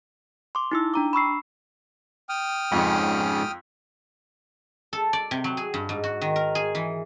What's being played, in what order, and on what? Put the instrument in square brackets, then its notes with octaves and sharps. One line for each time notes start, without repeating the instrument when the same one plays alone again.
[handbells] C6 D6
D#4 E4 E6
D4 A#5 D6
B5 C#6 E6 C7
[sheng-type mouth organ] G5 D#6 F6
[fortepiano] F2 [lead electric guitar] G#2 C#3
[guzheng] A4
D5
C3
F#3
G#4
G2
G#2
F#4
D#3
A#4
G#4
E3